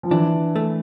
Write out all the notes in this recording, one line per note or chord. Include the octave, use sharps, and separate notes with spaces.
F3
E3 D4
A3